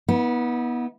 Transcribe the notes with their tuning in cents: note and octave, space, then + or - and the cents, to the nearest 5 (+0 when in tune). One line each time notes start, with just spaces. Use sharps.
B3 -25 D#4 +45